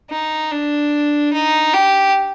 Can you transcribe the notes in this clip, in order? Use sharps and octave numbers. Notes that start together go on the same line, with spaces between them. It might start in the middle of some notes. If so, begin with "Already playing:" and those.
D#4
D4
D#4
G4